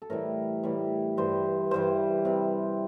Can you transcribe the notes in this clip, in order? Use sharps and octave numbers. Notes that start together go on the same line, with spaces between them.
A4
A2 E3 G3 A#4
A2 E3 G3
G2 E3 G3 C5
G2 E3 G3 C5
C3 G3